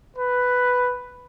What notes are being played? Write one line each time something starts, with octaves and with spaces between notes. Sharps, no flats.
B4